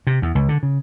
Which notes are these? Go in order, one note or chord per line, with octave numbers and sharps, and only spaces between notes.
C3
E2
C#2
D3
C#3